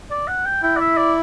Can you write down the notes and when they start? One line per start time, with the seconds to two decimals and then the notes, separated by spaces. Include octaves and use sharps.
0.11 D5
0.28 F#5
0.45 G5
0.63 E4 G5
0.77 D5
0.80 E5
0.97 D5